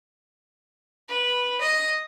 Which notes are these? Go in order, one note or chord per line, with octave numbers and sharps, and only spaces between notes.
B4
D#5